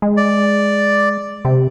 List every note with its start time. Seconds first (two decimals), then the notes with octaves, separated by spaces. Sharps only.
0.02 G#3
0.17 D5
1.45 C3